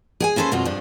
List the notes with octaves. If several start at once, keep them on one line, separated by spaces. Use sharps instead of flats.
G#4 G5 G#5
A#3 C#4 A4 B4 C5
F2 B2 F#3 F4
G2 F3 D4